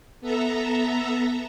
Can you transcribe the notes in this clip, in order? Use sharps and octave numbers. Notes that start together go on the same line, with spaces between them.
B3 A4 E5 A#5